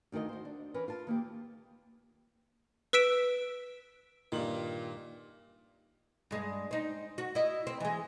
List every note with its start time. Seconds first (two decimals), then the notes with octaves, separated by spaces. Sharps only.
0.12 D2 D#3 F4 A#4 D#5
0.29 F#4 C5
0.45 D4
0.74 E3 C#4 A#4 B4
0.88 F4 A#4 A5
1.07 D#3 A#3 E4 G4
2.93 B4 E6 B6 D7 E7
4.32 G2 A#2 D#3 F#7
6.31 G2 G#3
6.71 C4 D#4
7.18 F#4
7.35 E4 D#5
7.67 C4
7.80 E3 G#3